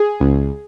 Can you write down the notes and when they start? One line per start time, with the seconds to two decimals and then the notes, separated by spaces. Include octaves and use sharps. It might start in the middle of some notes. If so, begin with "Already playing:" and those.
Already playing: G#4
0.20 C#2